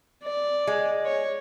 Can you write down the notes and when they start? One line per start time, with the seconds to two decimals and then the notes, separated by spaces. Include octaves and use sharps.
0.23 D5
0.67 G#3
1.05 C#5